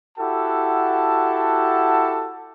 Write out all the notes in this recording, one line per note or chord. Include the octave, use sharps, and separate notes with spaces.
E4 F#4 G4 A4 F#5 A5